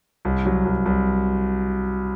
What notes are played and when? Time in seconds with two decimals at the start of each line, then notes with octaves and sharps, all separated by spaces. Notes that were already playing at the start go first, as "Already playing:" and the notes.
0.25 C2
0.46 F#3
0.65 C2
0.85 C2